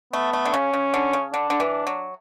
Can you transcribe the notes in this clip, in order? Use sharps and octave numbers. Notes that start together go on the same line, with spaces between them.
A3 B3
A3
D3
C#3 C#4
C#3
D3
C#3
D3 D4
D3
E3
F#3